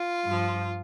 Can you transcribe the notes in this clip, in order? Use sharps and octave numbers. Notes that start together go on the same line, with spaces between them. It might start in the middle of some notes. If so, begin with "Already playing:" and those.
Already playing: F4
G2 F3